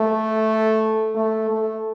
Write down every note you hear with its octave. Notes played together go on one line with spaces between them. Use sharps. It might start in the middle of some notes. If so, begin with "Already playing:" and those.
Already playing: A3
A3
A3